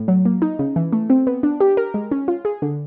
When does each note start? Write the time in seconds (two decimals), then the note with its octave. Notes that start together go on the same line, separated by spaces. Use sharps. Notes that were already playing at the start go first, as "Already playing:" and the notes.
Already playing: A2
0.08 F#3
0.25 A#3
0.42 D#4
0.59 C#3
0.76 E3
0.93 A3
1.10 C4
1.27 B3
1.43 D4
1.60 G4
1.77 A#4
1.94 G#3
2.11 C#4
2.28 F4
2.45 G#4
2.62 D3